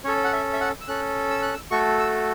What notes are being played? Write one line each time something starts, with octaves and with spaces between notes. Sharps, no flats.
C#4 A4 C#5
F#5
E5
E5
F#5
E6
C#4 A4 F#6
E6
F#6
E6
A3 F#4 A4 C#6
E6